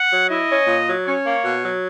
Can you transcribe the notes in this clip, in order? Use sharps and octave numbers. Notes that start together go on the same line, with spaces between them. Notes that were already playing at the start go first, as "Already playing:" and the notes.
Already playing: F#5
F#3
E4 D#5
C#4
A#2
F#3
C#4 C#5
A#3
B2
F#3